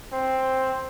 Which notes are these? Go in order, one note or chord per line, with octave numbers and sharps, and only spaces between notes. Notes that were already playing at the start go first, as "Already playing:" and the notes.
C4